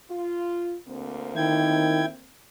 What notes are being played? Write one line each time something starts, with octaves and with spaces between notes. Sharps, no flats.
F4
D2 A#3 C4
D#3 E4 G5 G#6